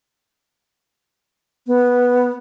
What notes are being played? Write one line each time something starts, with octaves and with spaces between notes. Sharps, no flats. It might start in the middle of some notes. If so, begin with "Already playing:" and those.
B3